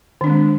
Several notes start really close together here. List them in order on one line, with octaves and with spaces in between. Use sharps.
D#3 D4 C4 G#3